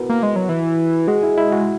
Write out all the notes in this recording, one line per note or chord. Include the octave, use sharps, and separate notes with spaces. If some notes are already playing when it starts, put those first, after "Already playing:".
Already playing: B3 E4 F#4 A#4 B4
A#3
G#3
F#3
E3
G#3 F#4
E4
E4
F#4